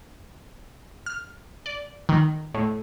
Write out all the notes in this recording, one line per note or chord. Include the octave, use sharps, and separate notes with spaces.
F6
D5
D#3
A2